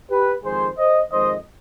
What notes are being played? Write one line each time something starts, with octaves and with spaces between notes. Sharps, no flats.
G4 B4
F2 D#3 G#3 G#4 C5
C5 D#5
F2 D#3 G#3 C5 D#5